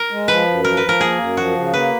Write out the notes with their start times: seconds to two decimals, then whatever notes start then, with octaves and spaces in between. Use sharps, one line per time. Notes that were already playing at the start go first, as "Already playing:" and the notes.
Already playing: A#4
0.10 G#3
0.28 F3 B4
0.47 F#2
0.64 F3 A#4
0.77 B4
0.83 F3
0.89 A#4
1.01 A#3 G#4
1.18 F#2
1.37 F3 F#4
1.55 C#3
1.73 A#3 B4